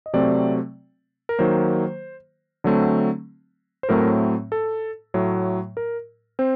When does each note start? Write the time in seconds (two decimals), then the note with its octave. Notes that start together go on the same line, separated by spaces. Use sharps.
0.06 D#5
0.13 C3 F#3 A3 C4 D5
1.29 A#4
1.39 D#3 F#3 A#3 C5
2.64 D3 F#3 A3 C4
3.83 C5
3.89 A2 F#3 A3 C4 A#4
4.52 A4
5.14 A2 F#3 A3
5.77 A#4
6.39 C4 C5